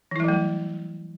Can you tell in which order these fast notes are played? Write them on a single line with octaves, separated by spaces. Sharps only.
E3 E4 G3 F#3 A3